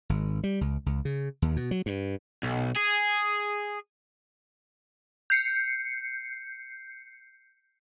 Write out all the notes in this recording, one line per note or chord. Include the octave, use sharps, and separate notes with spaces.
G#1
G3
C#2
C#2
C#3
D#2
B2
F#3
G2
B1
G#4
G6 C7 C#7